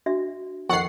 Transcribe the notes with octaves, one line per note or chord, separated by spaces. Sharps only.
D4 F#4 E5
F2 D#3 F#5 C#6 C7